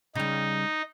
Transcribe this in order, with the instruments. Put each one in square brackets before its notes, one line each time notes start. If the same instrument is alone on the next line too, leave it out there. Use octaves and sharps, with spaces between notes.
[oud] C#3 G3 [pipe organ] D#4